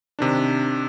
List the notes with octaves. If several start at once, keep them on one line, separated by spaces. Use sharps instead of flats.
C3 D#3 D4